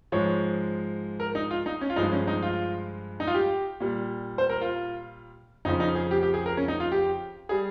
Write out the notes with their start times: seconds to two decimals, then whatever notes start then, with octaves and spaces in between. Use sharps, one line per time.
0.12 G#2 F3 G#3 C#5
1.20 A#4
1.35 D#4
1.51 F4
1.66 D#4
1.81 C#4
1.90 F4
1.96 G2 F3 G#3 D#4
2.12 C#4
2.27 D#4
2.42 F4
3.20 D#4
3.27 F4
3.34 G4
3.80 A#2 G3
4.38 C5
4.49 A#4
4.61 F4
5.65 F2 C#3 F3 D#4
5.80 D#4
5.95 G#4
6.11 G4
6.23 G4
6.34 G#4
6.46 A#4
6.57 C#4
6.68 D#4
6.80 F4
6.92 G4
7.49 G3 G#4